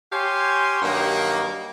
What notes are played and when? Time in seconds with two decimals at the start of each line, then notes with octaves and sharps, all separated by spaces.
0.13 G4 C#5 F5 G#5 C6
0.82 G2 D#3 F#3 A#3